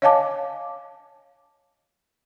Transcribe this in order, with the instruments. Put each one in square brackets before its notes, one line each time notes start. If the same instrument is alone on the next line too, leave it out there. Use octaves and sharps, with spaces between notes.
[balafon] C#5 D#5 F5 G#5 A5 D6